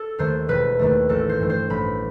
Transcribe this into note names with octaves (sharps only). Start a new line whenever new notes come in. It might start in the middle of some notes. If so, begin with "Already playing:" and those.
Already playing: A4
D#2 D#3 A3 C5
E1 B4
D#2 D#3 A3
A1 A4
C5
G2 E3 A3
C5
A1 B5